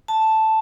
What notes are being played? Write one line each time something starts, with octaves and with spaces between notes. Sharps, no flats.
A5